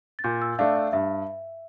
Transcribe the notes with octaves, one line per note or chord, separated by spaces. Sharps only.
A6
A#2 G6
E6
A3 D4 F5
E5
G2 E5